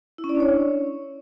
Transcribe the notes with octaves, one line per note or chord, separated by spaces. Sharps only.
E4
C#4
D5
D4
C#5